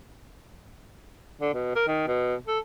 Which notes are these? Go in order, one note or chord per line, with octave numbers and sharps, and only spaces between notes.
D3
B2
A#4
D#3
B2
A4